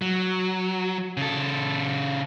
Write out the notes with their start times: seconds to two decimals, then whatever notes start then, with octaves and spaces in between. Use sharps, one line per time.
0.02 F#3
1.17 C#3 A4